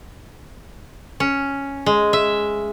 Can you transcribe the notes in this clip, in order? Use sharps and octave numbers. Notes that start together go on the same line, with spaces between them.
C#4
G#3
E5